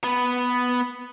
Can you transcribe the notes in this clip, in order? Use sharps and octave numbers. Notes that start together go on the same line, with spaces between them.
B3 B4